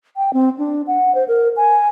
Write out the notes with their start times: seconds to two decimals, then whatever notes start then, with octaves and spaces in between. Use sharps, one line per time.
0.17 G5
0.33 C4
0.58 D4
0.87 F#5
1.15 C5
1.28 A#4
1.57 G#5